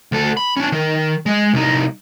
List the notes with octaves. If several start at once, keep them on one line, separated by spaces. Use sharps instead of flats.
D2 A4
B5
C#4 D4
D#3
G#3 G#4
C2 D#4